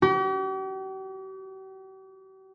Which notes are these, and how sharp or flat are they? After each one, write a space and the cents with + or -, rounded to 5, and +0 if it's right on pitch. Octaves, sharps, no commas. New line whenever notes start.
G4 -45